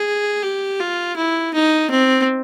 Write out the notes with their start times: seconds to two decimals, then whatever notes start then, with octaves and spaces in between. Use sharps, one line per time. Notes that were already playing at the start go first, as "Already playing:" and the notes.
Already playing: G#4
0.42 G4
0.80 F4
1.16 E4
1.54 D#4
1.90 C4